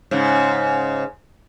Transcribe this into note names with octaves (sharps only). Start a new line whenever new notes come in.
G#2 C#3